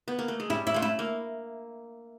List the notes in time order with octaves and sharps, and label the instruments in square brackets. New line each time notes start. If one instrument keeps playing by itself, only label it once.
[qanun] B3
A#3
A3
G#3
[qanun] G3 [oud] E4
[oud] E4
[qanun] A3 [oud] F4
[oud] E4
[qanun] A#3